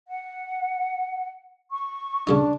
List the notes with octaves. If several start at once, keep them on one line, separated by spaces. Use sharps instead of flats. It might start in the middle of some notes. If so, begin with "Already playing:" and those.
F#5
C#6
C#3 G3 D4 D#4